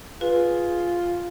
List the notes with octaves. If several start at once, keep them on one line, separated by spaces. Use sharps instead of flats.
F4 G#4 B4